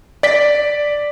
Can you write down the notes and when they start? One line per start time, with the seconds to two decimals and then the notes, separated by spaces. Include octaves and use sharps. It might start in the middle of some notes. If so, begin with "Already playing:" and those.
0.23 D5 B6